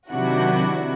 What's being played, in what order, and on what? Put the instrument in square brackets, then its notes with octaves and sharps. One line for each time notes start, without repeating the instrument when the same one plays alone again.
[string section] C3 D#3 F#3 D4 E4 F#4